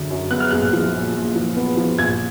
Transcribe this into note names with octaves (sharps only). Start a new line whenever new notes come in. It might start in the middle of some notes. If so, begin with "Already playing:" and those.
Already playing: F#2 D3 F#3
F#2
B3 F#6
F6
A#1 F#6
F3
A#2
A#2
F3
B3
F3
A#1 G#6